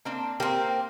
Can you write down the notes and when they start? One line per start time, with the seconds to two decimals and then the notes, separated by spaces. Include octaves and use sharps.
0.05 A#3 C4 D4
0.40 A#3 C4 G4 A#4